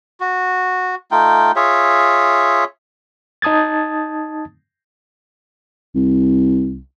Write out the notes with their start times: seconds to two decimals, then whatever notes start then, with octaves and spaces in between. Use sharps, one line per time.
0.20 F#4
1.11 A3 D#4 F4 G5
1.56 F4 G#4 C#5 E5
3.42 D#4 A5 D#6 G#6 A6
5.96 C2